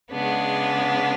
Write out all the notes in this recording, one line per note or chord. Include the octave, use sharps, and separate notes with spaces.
C#3 G#3 B3 D4